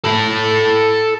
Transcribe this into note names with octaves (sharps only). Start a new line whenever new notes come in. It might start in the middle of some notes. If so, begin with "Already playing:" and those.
A4 B5